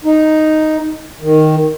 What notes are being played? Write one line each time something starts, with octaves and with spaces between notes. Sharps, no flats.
D#4
D#3